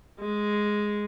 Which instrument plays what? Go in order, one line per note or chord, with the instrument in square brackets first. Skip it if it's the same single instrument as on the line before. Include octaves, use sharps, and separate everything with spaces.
[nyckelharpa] G#3